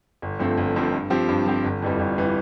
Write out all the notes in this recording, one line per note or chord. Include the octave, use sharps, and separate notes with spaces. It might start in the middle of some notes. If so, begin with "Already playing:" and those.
G1
G2 F3 A3 C4
G1
G2 F3 A3 C4
G2
F3 C4 G4
G2
F3 C4 G4
G1
F2 E3 G3
G1
E3 G3